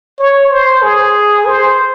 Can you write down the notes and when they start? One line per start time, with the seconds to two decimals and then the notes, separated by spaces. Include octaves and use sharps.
0.19 C#5
0.50 C5
0.82 G#4
1.46 C5